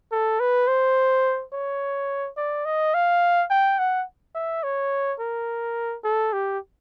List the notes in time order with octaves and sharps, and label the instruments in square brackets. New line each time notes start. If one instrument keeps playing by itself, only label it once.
[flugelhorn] A4
B4
C5
C#5
D5
D#5
F5
G5
F#5
E5
C#5
A#4
A4
G4